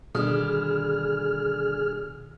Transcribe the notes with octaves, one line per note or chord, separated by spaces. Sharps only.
B2 D3 D#3 G3 D4 G#4 F6